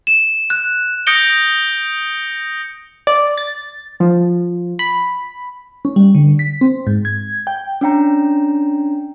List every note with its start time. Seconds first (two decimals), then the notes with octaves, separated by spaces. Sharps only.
0.07 E7
0.50 F#6
1.07 D#6 G6 A#6 C#7 D7 G7
3.07 D5
3.37 A6
4.00 F3
4.79 B5
5.85 C#4
5.96 G3
6.15 D3
6.39 B6
6.61 C4
6.87 G#2
7.05 G#6
7.47 G5
7.81 C#4 D4 G5 A#5